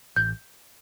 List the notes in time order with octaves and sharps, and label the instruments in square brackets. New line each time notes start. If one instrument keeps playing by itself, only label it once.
[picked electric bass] A1 [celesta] G6